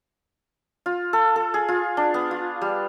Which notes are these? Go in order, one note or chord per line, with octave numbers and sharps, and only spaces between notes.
F4
A4
A4
G#4
F4
D4
B3
F4
G3